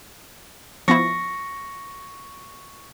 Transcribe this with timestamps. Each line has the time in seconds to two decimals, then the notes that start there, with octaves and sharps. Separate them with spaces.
0.88 F3 B3 E4 C#6 A#6